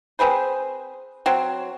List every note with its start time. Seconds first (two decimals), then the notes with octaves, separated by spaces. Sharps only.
0.19 C4 G#4 B4 C5
1.26 F#3 C4